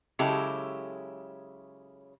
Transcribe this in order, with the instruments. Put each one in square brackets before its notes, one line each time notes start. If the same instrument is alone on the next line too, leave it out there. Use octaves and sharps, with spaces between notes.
[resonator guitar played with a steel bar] C#3 F#3 G#3 E4 G4 A4